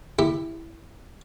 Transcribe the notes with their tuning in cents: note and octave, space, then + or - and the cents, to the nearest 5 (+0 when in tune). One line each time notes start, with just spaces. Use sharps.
E4 +0 G4 +20